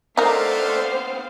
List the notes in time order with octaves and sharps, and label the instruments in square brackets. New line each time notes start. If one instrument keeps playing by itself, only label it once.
[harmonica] A3 D4 [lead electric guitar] B3 C4 [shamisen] D#4 A#4 [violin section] C5 F5